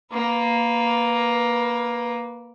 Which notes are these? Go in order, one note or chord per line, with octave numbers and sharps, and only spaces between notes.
A#3 B4